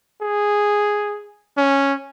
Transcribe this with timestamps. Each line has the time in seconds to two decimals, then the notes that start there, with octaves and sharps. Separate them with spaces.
0.22 G#4
1.57 C#4